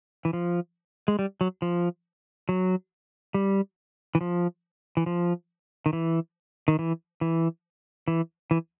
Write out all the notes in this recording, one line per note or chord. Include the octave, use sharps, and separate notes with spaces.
E3
F3
G#3
G3
F#3
F3
F#3
G3
E3
F3
E3
F3
D#3
E3
D#3
E3
E3
E3
E3